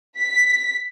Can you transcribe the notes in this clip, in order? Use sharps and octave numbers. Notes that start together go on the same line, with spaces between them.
B6